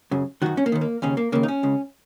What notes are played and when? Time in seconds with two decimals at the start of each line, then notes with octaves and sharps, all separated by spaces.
0.11 F#2 C#3
0.42 F#2 D#3 F#4
0.57 C#4
0.66 A#3
0.72 D#2 D#3
0.81 A#3
1.02 D#2 C#3 C#4
1.17 A#3
1.32 D#2 C#3 A#3
1.43 D#4
1.48 C#4
1.63 C#2 C#3